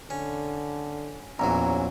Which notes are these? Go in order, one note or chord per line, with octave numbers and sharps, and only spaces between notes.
D3 C#4
A#1 E2 F#3 C#4 A#5